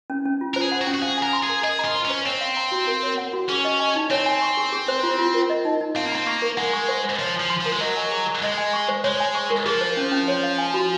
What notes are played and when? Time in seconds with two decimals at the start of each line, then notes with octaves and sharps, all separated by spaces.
0.10 C#4
0.25 C#4
0.41 F4
0.54 A#4 C5
0.61 G#4
0.72 F#5
0.81 F#4
0.87 C#4
0.94 F#4
1.02 G#4 F5
1.18 A#4 G#5
1.33 C6
1.43 G#4
1.49 A#4
1.63 G#4 D#5
1.79 A#5
1.85 F4
1.95 C5
2.05 C#4 C5
2.25 C4 C#5
2.41 F5
2.57 A#5
2.72 F#4
2.87 A#4
3.03 C#5
3.18 F#5
3.33 F#4
3.49 C#4 G#4
3.65 D#5
3.80 G#5
3.96 D#4
4.11 C4 C#5
4.26 G#5
4.42 C#6
4.57 G#4
4.72 G#4
4.88 C5
5.03 F4
5.19 F4
5.34 A#4
5.50 D#5
5.65 D#4
5.81 D#4
5.96 C4 F5
6.06 A#3
6.12 C4 A#5
6.27 A#3 C#6
6.42 A#4
6.57 G#3 F#5
6.73 C#6
6.89 C5
7.04 C5
7.19 F3 C#5
7.35 F3 G#5
7.50 C6
7.61 F3 A#4
7.72 G#3
7.81 F#3 D#5
7.97 G#5
8.11 G#4
8.27 G#4
8.43 G#3 D#5
8.58 G#5
8.73 C#6
8.88 C5
9.04 G#3 C#5
9.20 G#5
9.35 C#6
9.50 A#4
9.66 F3 G#4
9.81 C5
9.97 C#4
10.12 C#4
10.28 C#5
10.44 F5
10.58 G#5
10.74 F#4